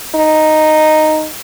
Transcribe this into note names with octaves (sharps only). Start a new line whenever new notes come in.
D#4